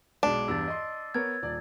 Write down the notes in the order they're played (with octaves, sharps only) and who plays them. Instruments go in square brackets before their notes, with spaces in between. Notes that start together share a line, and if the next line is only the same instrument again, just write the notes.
[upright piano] B1 G#3 [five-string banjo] D4
[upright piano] E2 G2 [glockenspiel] E6 A6
[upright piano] D#5 C6
[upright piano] B3 A#4 C#5 [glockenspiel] G#6
[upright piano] D#1 D5